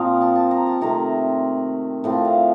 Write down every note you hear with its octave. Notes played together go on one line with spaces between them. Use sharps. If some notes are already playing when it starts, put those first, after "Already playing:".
Already playing: A#2 F3 C4 D#5 F5
A5
A5
A#5
A5
C3 D#3 A3 A#5
A2 F3 C4 A5
F5